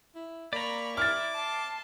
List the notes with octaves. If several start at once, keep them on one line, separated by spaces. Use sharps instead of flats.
E4
A#3 D5 A#5 B5 C#6
E4 D6 F6 A6
A5 C6